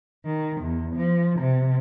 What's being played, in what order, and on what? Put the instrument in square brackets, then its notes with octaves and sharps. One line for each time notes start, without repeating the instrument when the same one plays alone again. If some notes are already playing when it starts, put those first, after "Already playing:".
[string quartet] D#3
E2
F3
C3